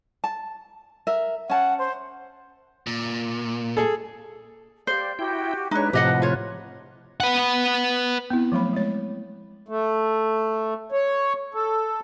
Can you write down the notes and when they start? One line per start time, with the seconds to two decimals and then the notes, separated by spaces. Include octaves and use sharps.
0.24 A5
1.07 A#4 E5
1.50 C#4 F#5 A5
1.79 C5
2.87 A#2
3.77 G#4 A4
4.87 G4 C5 D5 F5
5.19 E4 F#4 G4 G5
5.71 G#3 D4 D#4 B4 C#5 E5 F#6
5.93 A2 C3 F3 G4 D#5 F#5
6.22 F4 C#5
7.20 B4 F#5
8.30 B3 C4 E4
8.52 F3 F#3 A3 B5
8.73 G#3 C#5
9.68 A3
10.92 C#5
11.54 A4